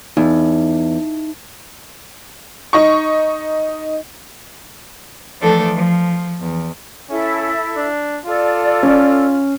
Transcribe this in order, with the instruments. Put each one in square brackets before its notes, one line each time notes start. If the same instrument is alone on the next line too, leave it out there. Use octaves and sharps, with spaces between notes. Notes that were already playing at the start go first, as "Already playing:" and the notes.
[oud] E2 [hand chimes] D#4
[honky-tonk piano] D#4 C#6
[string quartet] E3 F3 A3 D4 A4
F3
E2
[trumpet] C#4 [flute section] E4 A4 E5
[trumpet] D4
[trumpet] F4 [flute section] A4 D5
[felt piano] C#4